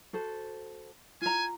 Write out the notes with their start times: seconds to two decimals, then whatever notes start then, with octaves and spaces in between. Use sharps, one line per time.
0.13 F#4 A4 C5
1.21 F4 G#5 A#5